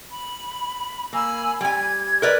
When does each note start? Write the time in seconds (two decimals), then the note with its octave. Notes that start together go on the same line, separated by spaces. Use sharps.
0.12 B5
1.13 A#3 G#5 B5 E6
1.61 G3 G#5 G#6
2.22 A#4 B4 D5